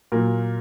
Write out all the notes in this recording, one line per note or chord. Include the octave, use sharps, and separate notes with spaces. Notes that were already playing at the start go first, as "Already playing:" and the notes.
A#2 F#3 A#4